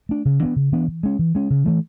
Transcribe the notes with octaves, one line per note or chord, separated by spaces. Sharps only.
A3 D4
C#3
E3 B3 D4
C#3
E3 B3 D4
E3
G#3 C#4
E3
G#3 C#4
C#3
E3 A3